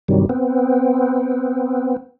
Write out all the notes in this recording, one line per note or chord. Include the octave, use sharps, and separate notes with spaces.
G2 C3 D#3 F#3 G3
B3 C4